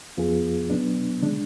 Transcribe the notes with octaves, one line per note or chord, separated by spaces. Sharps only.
F2 F3 B3 F4 G#4
B2 F#3 B3 D4
D3 G#3 D4